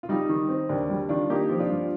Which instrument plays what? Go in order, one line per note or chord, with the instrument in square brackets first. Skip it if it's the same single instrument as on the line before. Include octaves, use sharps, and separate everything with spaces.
[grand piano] F4
[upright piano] G3 [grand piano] D#4
[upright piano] D#3
C4
[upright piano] D#2 [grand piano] D4
[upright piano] G3
[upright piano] D#3 [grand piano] D4 F4
[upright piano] A#3 [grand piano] D#4 G4
[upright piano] F3
[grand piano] D4 F4
[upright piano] G2